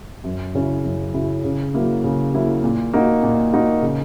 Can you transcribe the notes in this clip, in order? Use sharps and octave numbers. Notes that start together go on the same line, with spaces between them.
F#2
C#3 F#3 C#4 E4
F#2
C#3 F#3 C#4 E4
C#3
F#3 A#3 E4
C#3
F#3 A#3 E4
A#2
A#3 D#4 F#4
A#2
A#3 D#4 F#4
C#3